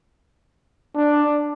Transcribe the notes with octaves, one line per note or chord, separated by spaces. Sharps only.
D4